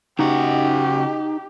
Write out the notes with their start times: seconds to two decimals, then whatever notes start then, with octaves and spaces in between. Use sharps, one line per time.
0.19 C#3 D#4 F#4 G4